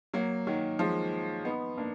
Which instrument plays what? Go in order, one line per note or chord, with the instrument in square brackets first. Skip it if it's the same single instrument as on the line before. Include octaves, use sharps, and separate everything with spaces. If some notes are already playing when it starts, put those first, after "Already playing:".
[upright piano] F#3 A#3
D#3 F#3
F3 G#3
B3 D#4
A#3 D4